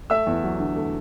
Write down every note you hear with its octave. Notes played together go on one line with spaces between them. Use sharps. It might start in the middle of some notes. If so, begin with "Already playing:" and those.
A3 E5 E6
E2
F#3
D3
A3